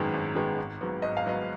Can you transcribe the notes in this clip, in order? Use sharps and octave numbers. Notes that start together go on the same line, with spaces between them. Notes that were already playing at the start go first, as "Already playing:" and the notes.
Already playing: G#1 F#2 D#3 G#3 B3
G#1
F#2 D#3 G#3 B3
G#1
G#2 F#3 B3
G#1 D#5
F5
G#2 F#3 B3 D#5